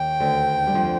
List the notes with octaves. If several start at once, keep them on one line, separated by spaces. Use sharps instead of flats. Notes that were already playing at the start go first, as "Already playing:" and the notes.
Already playing: D#2 D#3 G5
D2 D3
G3
F2 F3